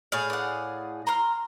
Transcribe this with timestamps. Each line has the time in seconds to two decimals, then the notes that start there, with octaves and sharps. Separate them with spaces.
0.12 A2 G#4 F5
0.30 D5 F#5
1.07 A#5 C6 F6